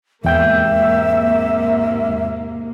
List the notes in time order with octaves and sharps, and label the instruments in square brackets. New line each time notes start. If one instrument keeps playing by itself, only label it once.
[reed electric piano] E2 G5 G6 [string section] G#2 C3 A#3 [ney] E5